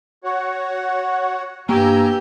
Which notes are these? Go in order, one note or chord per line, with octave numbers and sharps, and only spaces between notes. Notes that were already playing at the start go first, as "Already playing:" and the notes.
F#4 C#5 F#5
G2 A#3 G4 G#5 A#5 E6